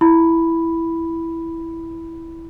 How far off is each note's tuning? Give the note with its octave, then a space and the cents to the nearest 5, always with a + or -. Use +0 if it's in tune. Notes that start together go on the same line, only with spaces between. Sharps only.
E4 +0 B5 +0